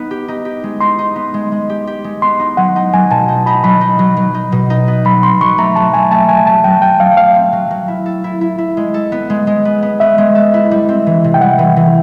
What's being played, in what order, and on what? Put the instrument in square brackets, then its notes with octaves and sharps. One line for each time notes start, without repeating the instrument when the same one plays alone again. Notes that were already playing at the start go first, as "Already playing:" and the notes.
Already playing: [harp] B3 D#4
G4
D#4
G4
G#3
[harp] D#4 [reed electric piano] C6
[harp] D#4
B3
G#3
G#3
G4
G4
G#3
[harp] B3 [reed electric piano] C6
[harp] D#4
[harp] F#3 [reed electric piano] F#5
[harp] D#4
[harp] F#3 [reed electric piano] G#5
[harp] B2 [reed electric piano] A5
[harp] D#4
[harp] D#4 [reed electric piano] B5
[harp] F#3 [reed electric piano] B5
[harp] D#4
F#3
F#3
D#4
B2
D#4
B3
[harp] F#3 [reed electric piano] B5
[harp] C4 [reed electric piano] C6
[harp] F#3 [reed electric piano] C#6
[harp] A3 [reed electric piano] A#5
[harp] F#3 [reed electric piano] A5
[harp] A3 [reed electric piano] G#5
[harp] A3 [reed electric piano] A5
[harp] F#3 [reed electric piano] G#5
[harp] F#3 [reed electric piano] A5
[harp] F#3 [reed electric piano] G5
[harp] F#3 [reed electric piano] G5
[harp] F#3 [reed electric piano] F5
[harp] A3 [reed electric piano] F5
[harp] C4
F#3
F#3
E4
A4
E4
E4
E4
G#3
A4
B3
G#3
G#3
B3
B3
[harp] B3 [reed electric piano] E5
[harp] G#3
A4
E4
G3
C4
E3
C3
[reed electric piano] G5
[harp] G3 [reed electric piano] F#5
[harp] E3
E3